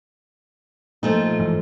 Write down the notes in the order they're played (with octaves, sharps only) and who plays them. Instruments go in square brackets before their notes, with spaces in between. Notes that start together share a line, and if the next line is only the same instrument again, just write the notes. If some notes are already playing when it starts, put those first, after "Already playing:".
[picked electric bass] A#2 [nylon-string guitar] F3 A3 D#4
[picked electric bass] G1 G#2 E3